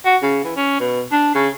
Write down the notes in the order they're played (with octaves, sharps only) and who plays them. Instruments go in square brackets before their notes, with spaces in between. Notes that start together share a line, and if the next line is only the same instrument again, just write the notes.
[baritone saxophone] F#4
C#3
E3
C#4
B2
D4
C#3